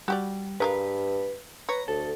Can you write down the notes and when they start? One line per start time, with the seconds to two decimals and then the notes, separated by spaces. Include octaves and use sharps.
0.08 G3 F#4 G4 D5
0.60 G2 G#3 A#4 B4 F5
1.69 B4 C#5 A#5
1.88 D2 A4